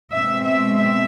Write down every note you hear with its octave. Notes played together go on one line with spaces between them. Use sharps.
B2 G#3 C4 E5
E5
E5